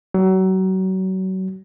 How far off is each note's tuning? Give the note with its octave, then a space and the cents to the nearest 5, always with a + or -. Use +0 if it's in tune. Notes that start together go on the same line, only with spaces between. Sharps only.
F#3 +30